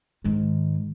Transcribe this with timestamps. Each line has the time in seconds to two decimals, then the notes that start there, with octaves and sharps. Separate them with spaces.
0.24 G#2 D#3